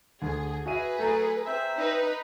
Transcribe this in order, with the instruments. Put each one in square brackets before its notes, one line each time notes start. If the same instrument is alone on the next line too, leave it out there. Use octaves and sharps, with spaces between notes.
[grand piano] D2 [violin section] G#4
[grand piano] F#4 E5 D#7 [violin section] G#4 B4
[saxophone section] F#3 A3 [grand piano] G#5 A#5
[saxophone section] C4 E5
[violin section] D#4 B4